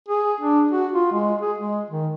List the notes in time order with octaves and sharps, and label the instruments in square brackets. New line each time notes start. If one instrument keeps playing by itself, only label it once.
[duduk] G#4
D4
F#4
F4
G#3
G#4
G#3
D#3